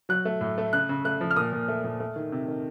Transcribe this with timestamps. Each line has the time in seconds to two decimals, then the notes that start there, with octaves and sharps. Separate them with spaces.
0.09 F#3 F#6
0.25 A3
0.41 A2
0.58 A3
0.73 C#3 F#6
0.89 C#3
1.05 A3 F#6
1.21 F3
1.31 F6
1.36 A#2 D#6
1.53 A#2
1.68 A3
1.84 A#2
2.00 A3
2.16 D#3
2.32 C3
2.48 D#3